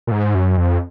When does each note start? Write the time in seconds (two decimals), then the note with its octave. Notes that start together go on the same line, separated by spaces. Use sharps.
0.07 A#2
0.12 G#2
0.35 F#2
0.57 F2